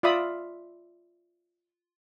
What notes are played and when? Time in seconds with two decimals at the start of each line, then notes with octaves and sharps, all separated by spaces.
0.03 F4 D5 E5 B5 D#6